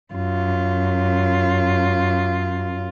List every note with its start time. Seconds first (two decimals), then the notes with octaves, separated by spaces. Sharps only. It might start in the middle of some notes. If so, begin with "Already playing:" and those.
0.14 F#2 F4